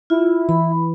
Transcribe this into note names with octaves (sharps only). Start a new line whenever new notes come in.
E4 F4
E3 B5